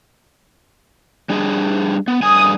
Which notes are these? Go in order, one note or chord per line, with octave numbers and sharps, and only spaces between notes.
G3 D4 G#4
B3
G2 G#4 G#5 D#6